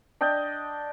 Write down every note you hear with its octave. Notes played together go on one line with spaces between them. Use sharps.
D4 D#5 G5